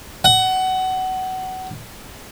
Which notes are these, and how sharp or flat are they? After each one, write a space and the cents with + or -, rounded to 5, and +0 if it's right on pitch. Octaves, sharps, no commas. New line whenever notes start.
F#5 +20